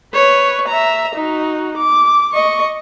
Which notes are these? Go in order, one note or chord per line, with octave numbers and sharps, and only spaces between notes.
B4 C#5
E5 A#5
D#4 F#4
D6
D#5 C#6